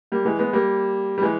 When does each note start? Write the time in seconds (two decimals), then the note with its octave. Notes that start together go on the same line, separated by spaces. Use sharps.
0.12 G3 A#3
0.25 E3 G#3
0.39 G#3 B3
0.53 G3 A#3
1.18 G3
1.22 E3 G#3